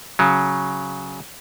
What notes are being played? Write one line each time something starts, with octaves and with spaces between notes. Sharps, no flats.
C#3 F#3